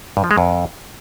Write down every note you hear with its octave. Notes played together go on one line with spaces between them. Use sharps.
G2
F3
G#3
F2